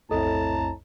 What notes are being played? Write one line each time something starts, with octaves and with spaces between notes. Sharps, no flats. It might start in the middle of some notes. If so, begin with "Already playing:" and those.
B1 F2 A2 C4 A4 D#5 A5 A#5